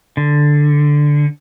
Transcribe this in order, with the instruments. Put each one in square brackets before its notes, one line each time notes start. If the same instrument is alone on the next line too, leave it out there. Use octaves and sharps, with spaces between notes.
[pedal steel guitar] D3